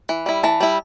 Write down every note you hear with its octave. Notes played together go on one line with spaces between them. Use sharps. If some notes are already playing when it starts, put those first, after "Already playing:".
E3
G3 E4
E3 A5
G3 E4